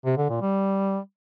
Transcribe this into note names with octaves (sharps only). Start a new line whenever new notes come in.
C3
D3
A#2
G3